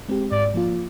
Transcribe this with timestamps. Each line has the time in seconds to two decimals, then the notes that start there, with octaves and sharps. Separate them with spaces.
0.09 G#3 C4 G4
0.31 G#2 D5
0.54 F3 A#3 F4